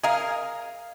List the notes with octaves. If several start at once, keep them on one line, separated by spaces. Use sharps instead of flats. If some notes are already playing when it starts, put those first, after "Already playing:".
G#4 A#4 D#5 F5